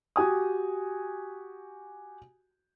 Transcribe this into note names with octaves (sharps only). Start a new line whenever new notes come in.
F#4 G4 G#5 D#6